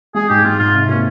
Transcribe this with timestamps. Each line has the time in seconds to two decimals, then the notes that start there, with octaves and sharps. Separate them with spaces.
0.15 G#3 G#4
0.29 G#2 G4
0.44 G#3 F4
0.59 G#2 F4
0.74 C3
0.89 A#3 C#4